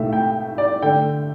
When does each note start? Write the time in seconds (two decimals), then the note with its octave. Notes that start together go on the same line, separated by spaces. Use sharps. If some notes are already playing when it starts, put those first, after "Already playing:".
Already playing: B1 A2 A3 E5
0.13 G5
0.58 D5
0.82 D3 A3 G5